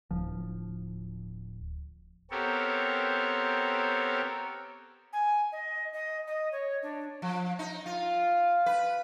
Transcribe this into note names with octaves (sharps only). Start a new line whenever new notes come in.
D1 F3
B3 C4 G4 A4 A#4 C#5
G#5
D#5
D#5
D#5
C#5
D4
F3
D#4
F4
B4